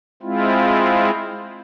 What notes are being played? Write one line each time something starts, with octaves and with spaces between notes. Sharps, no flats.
G#3 C4 E4 F4